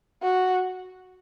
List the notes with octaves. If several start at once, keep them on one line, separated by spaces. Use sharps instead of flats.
F#4